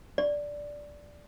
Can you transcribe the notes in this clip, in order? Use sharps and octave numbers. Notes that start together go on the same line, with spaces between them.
D5